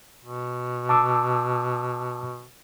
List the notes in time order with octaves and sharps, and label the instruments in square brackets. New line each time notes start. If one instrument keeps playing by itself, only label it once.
[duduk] B2
[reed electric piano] A5 D6 E6